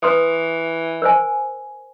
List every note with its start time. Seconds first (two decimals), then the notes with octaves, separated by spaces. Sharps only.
0.03 E3 B4 C6 D#6
1.02 A#4 C5 G#5